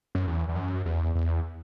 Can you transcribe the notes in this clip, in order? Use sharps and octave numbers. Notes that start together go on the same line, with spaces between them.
F#2
E2
E2
F#2
E2
E2